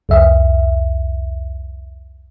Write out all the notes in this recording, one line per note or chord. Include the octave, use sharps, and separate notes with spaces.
C2 F2 E5